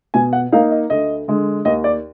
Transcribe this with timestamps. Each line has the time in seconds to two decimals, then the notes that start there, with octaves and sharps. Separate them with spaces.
0.14 B2 G#5
0.33 F#5
0.52 A#3 D#4 F5
0.71 D#5
0.90 D2 D#5
1.28 D3 G#3
1.65 D#2 D#5
1.84 D5